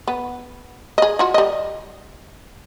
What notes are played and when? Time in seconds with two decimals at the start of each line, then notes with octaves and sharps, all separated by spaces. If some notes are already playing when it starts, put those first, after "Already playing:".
0.08 B3
0.98 G#4 D#5
1.19 F4 F#4
1.34 G3 D#5